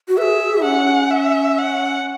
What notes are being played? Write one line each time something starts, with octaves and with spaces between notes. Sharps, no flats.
F#4
G#4 B4 E5
C#4 F#5
E5
F#5